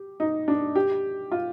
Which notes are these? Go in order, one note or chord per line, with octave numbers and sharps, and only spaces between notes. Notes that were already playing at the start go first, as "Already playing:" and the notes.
Already playing: G4
D#4
D4
G4
F4